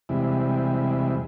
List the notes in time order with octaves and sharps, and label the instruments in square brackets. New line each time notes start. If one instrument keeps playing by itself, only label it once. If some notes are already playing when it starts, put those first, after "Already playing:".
[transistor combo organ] E2 C3 G3 G#3 E4